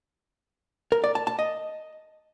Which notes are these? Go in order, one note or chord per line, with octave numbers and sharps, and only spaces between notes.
A#4
D5
A5
A5
D#5